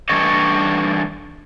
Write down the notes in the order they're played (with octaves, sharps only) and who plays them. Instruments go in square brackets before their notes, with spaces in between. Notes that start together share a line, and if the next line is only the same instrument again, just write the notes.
[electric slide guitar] E3 G3 D4 A4 C#5 D#5